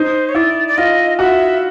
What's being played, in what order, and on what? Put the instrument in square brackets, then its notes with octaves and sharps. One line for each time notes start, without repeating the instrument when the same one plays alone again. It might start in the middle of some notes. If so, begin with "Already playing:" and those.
Already playing: [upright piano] D#4 [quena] C5
[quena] C#5
[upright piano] E4 [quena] D5
[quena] D5
[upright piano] F4 [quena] D#5
[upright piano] F#4 [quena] E5